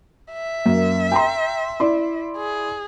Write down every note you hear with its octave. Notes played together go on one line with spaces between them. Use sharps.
E5
F#2 A#3
G5 A#5 C6
E4 D5 C6
G#4